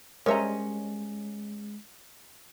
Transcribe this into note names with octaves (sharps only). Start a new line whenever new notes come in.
G3 G#3 C#4 A#4 C5 D#5 E5 A#5